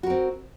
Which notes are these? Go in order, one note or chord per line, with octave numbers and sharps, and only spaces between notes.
C4 F#4 A#4